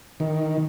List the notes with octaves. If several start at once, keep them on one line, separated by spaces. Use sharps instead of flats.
D#3